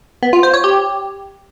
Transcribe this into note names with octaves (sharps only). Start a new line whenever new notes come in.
B3
F4
C5
C#5
G4